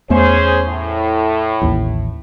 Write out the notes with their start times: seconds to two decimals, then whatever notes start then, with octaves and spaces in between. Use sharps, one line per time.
0.10 E2 A3 B3 C#4 G#4 C5
0.68 A2
1.61 A1 D#2